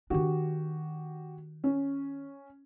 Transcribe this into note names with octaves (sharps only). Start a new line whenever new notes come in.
D#3 D4 F#4 G4
C#4